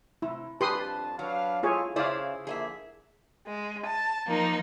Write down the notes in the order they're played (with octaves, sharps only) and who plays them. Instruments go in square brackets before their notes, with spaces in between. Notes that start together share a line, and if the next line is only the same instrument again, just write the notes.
[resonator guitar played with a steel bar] C3 [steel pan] E4
[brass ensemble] F2 D4 A5 [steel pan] G4 C6 D#6 [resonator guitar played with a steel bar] B4
[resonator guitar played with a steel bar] F#3 [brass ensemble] D4 B4 F5
[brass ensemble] E4 A4 [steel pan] F4 G#4 C#5
[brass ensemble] C#3 [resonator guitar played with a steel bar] E4 G#4 C5 [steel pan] D5 F5
[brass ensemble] D3 F3 A#3 [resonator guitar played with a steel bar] G#4 D#5 E5
[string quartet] G#3
A5
F3 A#3 D#4